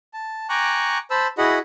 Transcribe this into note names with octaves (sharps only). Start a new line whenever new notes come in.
A5
G5 G#5 A#5 C#6 D6 F#6
C5 A5 B5 E6
E4 F#4 G#4 D#5 F#5 B5